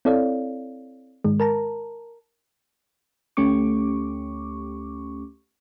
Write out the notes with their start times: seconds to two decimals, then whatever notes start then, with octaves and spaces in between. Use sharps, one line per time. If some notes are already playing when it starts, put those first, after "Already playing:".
0.05 C4 E4 A4 C#5 D5 F5
1.24 G#2 D#3 G#3
1.40 A#4 A5 A#5
3.37 D2 A3 C#4 G4 C#6 D6